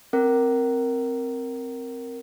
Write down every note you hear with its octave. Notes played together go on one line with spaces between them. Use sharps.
C4 A#4